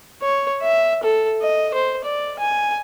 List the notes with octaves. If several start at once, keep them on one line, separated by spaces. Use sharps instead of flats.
C#5
E5
A4
D#5
C5
D5
G#5